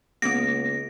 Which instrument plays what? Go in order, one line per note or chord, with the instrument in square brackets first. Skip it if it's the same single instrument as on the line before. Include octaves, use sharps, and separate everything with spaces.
[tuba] C#2 [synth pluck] A#3 B3 [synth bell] A#6